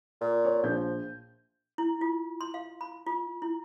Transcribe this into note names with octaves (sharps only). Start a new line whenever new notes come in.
A#2
C#5
A#1 F3 G6
E4
F4
C6
F5
B5
F4
E4